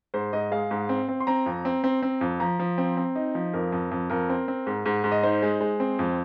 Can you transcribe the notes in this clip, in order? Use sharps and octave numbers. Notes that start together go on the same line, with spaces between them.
G#2 C5
G#2 D#5
G#3 F5
G#2
C4
C4
C6
C4 A#5
F2
C4
C4
C4
F2
F3 A#5
F3
C4
C4
D#4
F3
F2 A#4
F2
F2
F2 A#4
C4
C4
G#2
G#2
G#2
D#5
D#4 C5
G#3
G#3
C4
F2